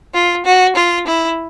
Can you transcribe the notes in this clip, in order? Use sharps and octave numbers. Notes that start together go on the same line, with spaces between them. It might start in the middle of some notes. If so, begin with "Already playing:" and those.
F4
F#4
F4
E4